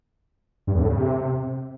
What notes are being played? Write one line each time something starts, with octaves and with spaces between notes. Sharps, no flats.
G2
E2
A2
C#3
C3